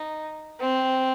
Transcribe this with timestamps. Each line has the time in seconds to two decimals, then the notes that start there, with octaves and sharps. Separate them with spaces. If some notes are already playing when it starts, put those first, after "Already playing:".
Already playing: D#4
0.60 C4